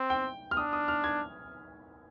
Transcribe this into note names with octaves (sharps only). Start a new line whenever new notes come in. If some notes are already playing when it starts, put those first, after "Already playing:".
Already playing: C4
G5
F6
D4 D#6
D#6
F6
G#6